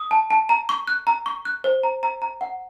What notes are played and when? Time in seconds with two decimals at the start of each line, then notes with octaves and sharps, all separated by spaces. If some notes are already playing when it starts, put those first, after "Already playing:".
Already playing: D#6
0.11 A5
0.30 A5
0.49 A#5
0.69 C#6
0.88 F#6
1.07 A#5
1.26 C#6
1.45 F#6
1.64 C5
1.83 A#5
2.03 A#5
2.22 A#5
2.41 F#5